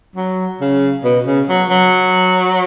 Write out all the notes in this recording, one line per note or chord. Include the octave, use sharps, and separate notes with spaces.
F#3
C#3
B2
C#3
F#3
F#3